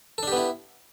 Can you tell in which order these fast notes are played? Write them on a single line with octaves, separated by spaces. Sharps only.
A4 D4 G4 B3 E4